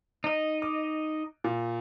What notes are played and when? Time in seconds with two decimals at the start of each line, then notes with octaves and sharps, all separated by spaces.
0.24 D#4 D#5
0.62 D6
1.44 A#2